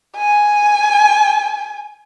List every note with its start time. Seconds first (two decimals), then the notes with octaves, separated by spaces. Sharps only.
0.17 G#5